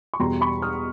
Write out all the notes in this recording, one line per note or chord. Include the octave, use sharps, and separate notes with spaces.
C#6
E2 B2 G3 A#5 C6
B5 C#6
D#6 F6